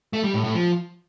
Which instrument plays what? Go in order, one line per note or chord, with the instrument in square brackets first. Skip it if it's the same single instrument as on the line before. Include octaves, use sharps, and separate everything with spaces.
[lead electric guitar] A3
G3
A2
A2
F3